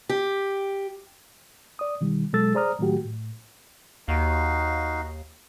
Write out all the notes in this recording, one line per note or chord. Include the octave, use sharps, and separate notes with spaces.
G4
D5 D#6
B2 D#3 G3
B2 F#3 G#3 A4 E6 A6
G#4 C5 D5 A#5 D#6 F6
A2 D#3 F#3 A3 F#4 G4
A2
D#2 D#4 F#4 F5